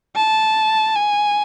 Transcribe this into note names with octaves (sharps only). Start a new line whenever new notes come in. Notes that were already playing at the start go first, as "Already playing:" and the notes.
A5
G#5